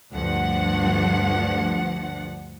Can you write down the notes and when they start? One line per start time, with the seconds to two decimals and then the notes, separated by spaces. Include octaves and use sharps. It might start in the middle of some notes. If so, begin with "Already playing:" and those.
0.12 D2 G2 F3 D4 F#5